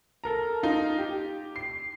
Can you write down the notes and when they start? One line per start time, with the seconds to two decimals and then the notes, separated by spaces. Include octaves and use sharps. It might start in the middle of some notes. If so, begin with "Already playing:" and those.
0.24 A4 A#4 A#5
0.63 D#4 F4
0.99 G4
1.56 C7